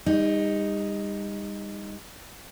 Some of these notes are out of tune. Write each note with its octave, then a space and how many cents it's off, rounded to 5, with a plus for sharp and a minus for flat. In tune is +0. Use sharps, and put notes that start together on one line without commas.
G3 +40 D#4 +0